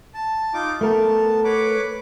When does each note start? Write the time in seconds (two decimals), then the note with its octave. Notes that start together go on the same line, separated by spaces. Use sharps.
0.14 A5
0.54 D#4 F4 D6
0.81 A3 B3 A#4 A5
1.44 B4 C#5 D6